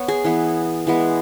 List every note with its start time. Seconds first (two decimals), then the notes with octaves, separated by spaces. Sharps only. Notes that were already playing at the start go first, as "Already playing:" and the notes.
Already playing: B3 C#5
0.08 G#4
0.24 E3 B3
0.87 E3 G#3 B3